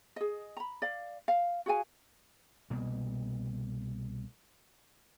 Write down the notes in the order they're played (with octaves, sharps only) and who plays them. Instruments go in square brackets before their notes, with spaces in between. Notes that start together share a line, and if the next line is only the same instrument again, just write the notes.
[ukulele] G#4 D#5
A#5 B5
D5 F5
F5
F#4 G#4 F5 G#5
[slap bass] C2 B2 A#3